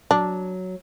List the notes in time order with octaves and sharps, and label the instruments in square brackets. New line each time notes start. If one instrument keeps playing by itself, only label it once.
[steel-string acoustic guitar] F#3 [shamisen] D4